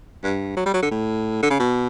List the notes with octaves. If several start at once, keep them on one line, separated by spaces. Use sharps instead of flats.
G2
F#3
G3
F#3
D3
A2
D3
C#3
B2